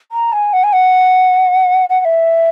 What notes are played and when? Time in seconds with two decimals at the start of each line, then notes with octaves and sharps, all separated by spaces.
0.12 A#5
0.32 G#5
0.53 F#5
0.63 G#5
0.73 F#5
1.89 F#5
2.00 F#5
2.05 E5